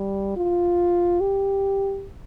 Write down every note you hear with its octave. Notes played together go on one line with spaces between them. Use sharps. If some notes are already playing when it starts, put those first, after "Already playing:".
Already playing: G3
F4
G4